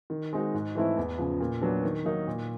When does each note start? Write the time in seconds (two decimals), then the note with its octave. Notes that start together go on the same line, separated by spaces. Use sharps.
0.10 D#3
0.33 G#3 C4 D#4 F#4
0.54 G#2
0.75 E3 A3 C4 E4
0.97 E2
1.18 C#3 F3
1.41 A#2
1.61 F#3 B3 D4
1.83 D#3
2.05 F#3 A#3 D#4
2.28 A#2